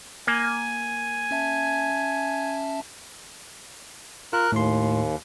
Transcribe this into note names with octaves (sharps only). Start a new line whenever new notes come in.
A#3 G#5
C#4 E5 A5
F4 A#4 F#6
D#2 A2 C6